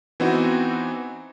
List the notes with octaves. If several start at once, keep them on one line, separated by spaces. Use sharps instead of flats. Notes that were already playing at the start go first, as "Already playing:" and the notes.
E3 B3 C4 D#4 F#4